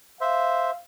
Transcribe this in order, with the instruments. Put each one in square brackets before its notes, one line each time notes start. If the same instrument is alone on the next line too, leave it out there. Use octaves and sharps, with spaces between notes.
[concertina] C5 E5 [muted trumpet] F5